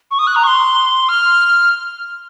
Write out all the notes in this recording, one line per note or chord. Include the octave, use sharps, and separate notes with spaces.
C#6
D#6
F#6
A#5
C#6
C6
F6